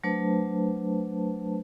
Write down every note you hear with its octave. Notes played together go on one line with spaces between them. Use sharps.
F#3 A3 D4 B4 C5 A5